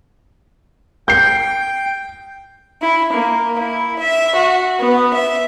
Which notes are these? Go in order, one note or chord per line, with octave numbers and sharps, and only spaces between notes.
G5 G6 C7
E4
A#3
E4
E5
F#4
B3
E5